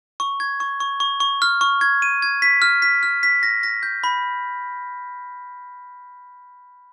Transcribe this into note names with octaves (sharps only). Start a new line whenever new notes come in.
C#6
G#6
C#6
C#6
C#6
C#6
F6
C#6
G#6
D#7
G#6
B6
F6
B6
F6
B6
A#6
A#6
G6
B5